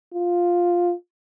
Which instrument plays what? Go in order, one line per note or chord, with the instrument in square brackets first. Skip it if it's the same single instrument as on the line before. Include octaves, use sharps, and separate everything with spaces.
[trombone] F4